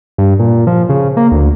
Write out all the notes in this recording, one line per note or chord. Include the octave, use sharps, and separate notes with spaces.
G2
A#2
F3
C#3
A#3
D2